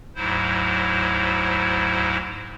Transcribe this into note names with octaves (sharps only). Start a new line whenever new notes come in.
D2 G#2 F#3 E4 C5